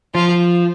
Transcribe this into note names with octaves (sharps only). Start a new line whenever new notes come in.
F3 F4